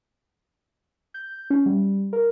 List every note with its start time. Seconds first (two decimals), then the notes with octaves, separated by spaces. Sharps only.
1.14 G6
1.50 C#4
1.66 G3
2.13 A#4